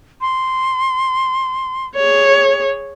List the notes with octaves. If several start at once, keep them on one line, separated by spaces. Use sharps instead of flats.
C6
G#4 C#5